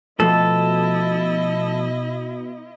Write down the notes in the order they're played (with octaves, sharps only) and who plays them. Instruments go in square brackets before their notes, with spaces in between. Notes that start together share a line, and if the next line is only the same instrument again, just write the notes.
[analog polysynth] B2 [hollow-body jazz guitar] F3 A3 [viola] E4 D#5 [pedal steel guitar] A4